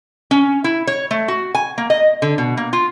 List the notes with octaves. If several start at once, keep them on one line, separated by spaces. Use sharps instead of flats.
C#4
E4
C#5
A3
F#4
G#5
A#3
D#5
D3
B2
A#3
F4